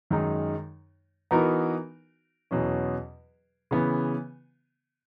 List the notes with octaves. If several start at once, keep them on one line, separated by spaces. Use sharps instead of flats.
F#2 D#3 G#3 D#4
E3 B3 D#4 F#4 A#4
E2 B2 F#3 C#4
C#3 E3 B3